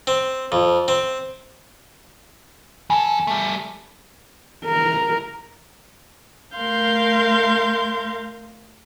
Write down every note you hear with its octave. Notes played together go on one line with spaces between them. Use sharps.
C4
F2
C4
F2 A4 G#5
G3 A3
A#4
A3 A#4 F5 C6 G6